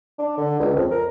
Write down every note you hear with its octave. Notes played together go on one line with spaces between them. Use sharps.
D4
D3
C#2
F2
A#4